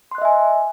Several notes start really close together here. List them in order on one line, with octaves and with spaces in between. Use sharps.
C6 F#6 D#5 E5 G#5